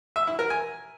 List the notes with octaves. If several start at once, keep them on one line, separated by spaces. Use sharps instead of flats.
E5
E4
A#4
G#5